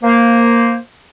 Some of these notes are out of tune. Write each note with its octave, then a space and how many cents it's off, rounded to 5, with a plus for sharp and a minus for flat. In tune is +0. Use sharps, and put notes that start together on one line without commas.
A#3 +0 C5 +0